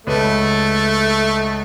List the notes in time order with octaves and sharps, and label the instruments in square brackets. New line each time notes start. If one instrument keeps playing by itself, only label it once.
[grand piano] C#2 B4 [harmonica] A3